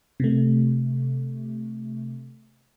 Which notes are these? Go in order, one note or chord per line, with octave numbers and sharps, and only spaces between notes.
C3 A3